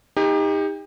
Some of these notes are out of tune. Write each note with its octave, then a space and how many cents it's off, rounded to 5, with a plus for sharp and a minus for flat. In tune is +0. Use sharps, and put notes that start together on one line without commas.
D#4 +15 G4 +35